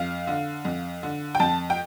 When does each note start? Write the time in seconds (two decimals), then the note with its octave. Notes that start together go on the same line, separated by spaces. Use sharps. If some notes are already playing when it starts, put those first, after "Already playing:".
Already playing: F2 F5
0.27 D3
0.65 F2
1.03 D3
1.35 G5
1.40 F2 A5
1.70 G5